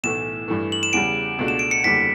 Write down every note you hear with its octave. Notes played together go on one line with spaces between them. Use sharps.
B1 A2 E3 A3 E7
G2 E3 A3
F#7
E7
E2 C#3 G3 D7
C#2 B2 A3 D4 F#4
E7
D7
C#7
F#1 E2 D3 G3 B6